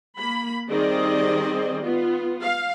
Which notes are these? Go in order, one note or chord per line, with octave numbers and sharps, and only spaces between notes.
A#3 B5
D#3 G3 C4 G#4 D5 D#5
B3 F4
F5